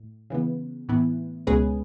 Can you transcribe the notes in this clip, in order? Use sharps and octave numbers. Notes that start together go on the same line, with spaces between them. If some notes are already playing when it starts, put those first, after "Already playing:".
Already playing: A2
C#3 E3 B3
A2 E3 B3 E4
C#2 B2 G#3 C#4 G#4 B4